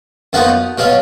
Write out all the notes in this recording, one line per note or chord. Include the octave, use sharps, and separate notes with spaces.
F#2 F3 B3 D#4 F#4
B2 F#3 C#4 F4